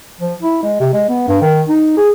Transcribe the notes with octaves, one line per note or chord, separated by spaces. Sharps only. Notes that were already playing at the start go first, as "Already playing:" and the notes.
F3
E4
G#3
C3
G#3
B3
G2
D#3
D#4
G#4